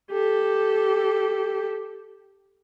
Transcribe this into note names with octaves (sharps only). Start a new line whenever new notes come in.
G4 A4